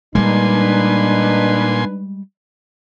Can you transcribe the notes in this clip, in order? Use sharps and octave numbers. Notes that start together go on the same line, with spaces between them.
A#2 G3 G#3 D4 D#4 B4 G#5 C6